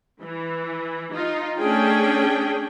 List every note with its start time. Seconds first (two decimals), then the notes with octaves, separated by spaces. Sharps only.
0.21 E3
1.12 D#4 F4
1.59 A3 C#4 D4 G#4 G5